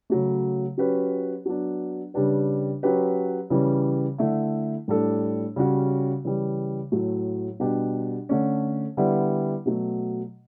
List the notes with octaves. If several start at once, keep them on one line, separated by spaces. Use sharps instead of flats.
C#3 F#3 A3
F#3 C#4 G4 B4
F#3 B3 D4
C#3 G3 D4 G4 B4
F#3 C#4 G4 B4
C#3 E3 G3 C#4
D3 A3 E4
A2 G3 D4 A4
C#3 G3 C#4 F#4
C#3 E3 G3
A2 F#3 A3
B2 G3 D4 G4
D3 A3 C#4
D3 G3 B3 E4
B2 F#3 A3